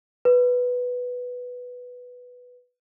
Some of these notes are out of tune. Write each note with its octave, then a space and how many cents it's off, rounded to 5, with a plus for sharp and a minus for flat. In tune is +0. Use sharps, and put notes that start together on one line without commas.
B4 +0